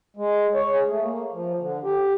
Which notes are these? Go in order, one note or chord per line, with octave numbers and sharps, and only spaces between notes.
G#3
C#5
G#4
A3
A#3
F3
D3
G4